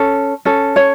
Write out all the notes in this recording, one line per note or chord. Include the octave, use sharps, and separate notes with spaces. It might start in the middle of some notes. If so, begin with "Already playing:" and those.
Already playing: C#4 A4
C#4 A4
C#5